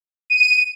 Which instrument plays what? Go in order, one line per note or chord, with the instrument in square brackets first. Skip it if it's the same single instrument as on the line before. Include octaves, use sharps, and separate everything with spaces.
[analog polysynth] D#7